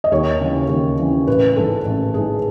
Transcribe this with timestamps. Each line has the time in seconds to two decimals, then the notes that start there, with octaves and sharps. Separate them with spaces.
0.04 D#5
0.11 D#2 C#5
0.40 C#3 E3
0.69 D#2
0.98 C#3 E3
1.27 A1 B4
1.56 G#2 E3 A4
1.85 A1
2.14 G#2 E3 G#4